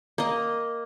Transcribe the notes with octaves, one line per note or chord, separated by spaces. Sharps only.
A#3 D#5